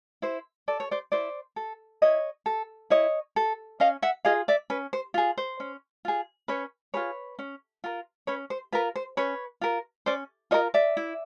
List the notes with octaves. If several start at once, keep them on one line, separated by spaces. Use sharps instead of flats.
E4 C5
A4 D5
C#5
C5 D5
E4 C5 D5
A4
E4 C#5 D#5
A4
E4 C#5 D#5
A4
C#4 D#5 F5
E5 F#5
F4 G#4 D#5 F5
D5 E5
C#4 B4
C5
F4 G#4
C5
C#4
F4 G#4
C#4 B4 C#5
F4 G#4 B4 C#5
C#4
F4 A#4
C#4 B4 C#5
C5
F4 A#4 B4
C5
C#4 B4 C#5
F4 A#4
C#4 C5 D5
F4 A#4 C#5 D#5
D5 E5
E4